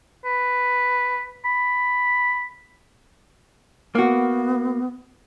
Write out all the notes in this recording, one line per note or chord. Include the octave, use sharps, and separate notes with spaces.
B4
B5
A#3 B3 F#4